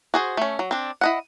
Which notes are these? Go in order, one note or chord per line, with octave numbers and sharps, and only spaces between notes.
F#4 G#4 C5
A3 C#4
F#3
C4 D4
E4 D#5 F#5